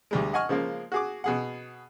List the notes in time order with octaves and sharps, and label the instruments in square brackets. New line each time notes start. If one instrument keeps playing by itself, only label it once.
[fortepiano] D2 G3 G#3
D#5 F#5 G#5 C#6 F6
C#3 F3 G#3 A#3
F#4 G#4 D6
B2 G#4 F#5